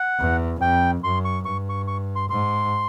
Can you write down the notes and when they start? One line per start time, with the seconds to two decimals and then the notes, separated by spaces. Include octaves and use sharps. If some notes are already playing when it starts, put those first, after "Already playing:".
Already playing: F#5
0.19 E2
0.61 F2 G5
1.04 F#2 C6
1.25 C#6
1.45 G2 C#6
1.69 C#6
1.88 C#6
2.16 C6
2.30 G#2 C6